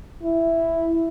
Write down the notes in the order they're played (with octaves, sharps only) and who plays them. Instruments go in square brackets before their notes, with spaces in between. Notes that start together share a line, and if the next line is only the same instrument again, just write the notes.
[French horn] E4